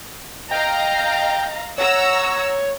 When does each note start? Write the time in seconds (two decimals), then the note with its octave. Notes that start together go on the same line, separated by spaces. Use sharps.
0.51 D#5 F5 G5 A#5
1.78 C#5 F#5 A#5 E6